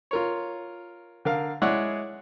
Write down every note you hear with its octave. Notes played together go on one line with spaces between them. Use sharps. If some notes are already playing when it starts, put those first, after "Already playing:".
F4 A#4 C#5
D3 A#4 F5
G#3 E4 G#4 C#5 D5 F#5